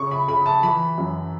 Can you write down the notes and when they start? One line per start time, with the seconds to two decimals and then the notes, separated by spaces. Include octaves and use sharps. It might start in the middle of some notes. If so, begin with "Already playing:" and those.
Already playing: C#3 C#6
0.11 B5
0.28 C#3 B5
0.46 A5
0.63 E3 B5
0.98 F#2